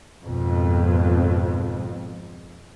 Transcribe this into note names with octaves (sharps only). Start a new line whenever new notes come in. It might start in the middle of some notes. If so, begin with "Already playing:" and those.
G#1 F2 B2